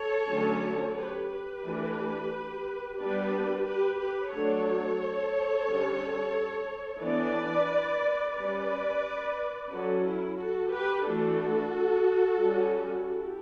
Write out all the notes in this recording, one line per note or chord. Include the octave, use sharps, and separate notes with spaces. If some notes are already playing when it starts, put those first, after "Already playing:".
Already playing: A4 C#5
D3 F#3 A3 C#4
G4 B4
G4 B4
E3 A3 D4
G3 B3 D4 G4 B4
G4 B4
G4 B4
F#3 A3 D4 A4 C#5
D3 G3 C#4
E3 B3 D4 B4 D5
G3 C#4 B4 D5
F#3 C#4 F#4 A4
E4
F#4 A4
G4 B4
E3 A3 D4 F#4 A4
G3 C#4
E4 G4